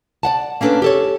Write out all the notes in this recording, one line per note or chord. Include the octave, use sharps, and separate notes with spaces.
D5 F#5 A5
A#3 C#4 D4 A4 B4
G4 A4 C#5